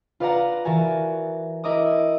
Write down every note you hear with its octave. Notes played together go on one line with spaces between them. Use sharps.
F4 B4 D5 F5 F#5 A#5
E3 F#4 A#4 G#5 A6
E4 A#4 D#5 D6 D#6